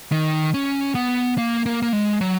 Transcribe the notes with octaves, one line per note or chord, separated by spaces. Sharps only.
D#3
C#4
B3
A#3
A#3
A#3
G#3
F#3